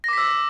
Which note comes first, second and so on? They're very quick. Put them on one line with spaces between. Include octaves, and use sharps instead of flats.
A#6 D6 B6 E6